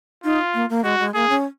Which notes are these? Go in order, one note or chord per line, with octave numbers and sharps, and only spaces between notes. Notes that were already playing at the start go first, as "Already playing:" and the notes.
D#4 F4
A#3
A#3
G#3 F#4
G#3
A#3 G#4
C#4